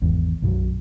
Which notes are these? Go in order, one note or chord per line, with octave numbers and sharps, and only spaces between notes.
G#1 E2
B1 F#2 F3 F#3